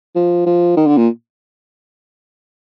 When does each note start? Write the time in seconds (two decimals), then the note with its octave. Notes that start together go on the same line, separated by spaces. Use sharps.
0.16 F3
0.46 F3
0.77 D#3
0.87 D3
0.97 A#2